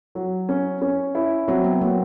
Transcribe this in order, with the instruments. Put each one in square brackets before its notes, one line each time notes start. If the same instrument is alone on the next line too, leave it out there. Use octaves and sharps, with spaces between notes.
[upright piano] F#3
C#4
C#4
E4
[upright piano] F#3 [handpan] C4
[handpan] B3
[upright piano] F#3 [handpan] A#3